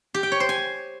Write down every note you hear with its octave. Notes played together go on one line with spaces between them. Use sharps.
G4
G5
C#5
C5
G#5